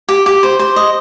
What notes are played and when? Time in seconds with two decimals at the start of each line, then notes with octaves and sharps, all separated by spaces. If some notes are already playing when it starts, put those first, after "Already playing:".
0.09 G4
0.26 G4
0.43 C5
0.59 C5
0.76 D#5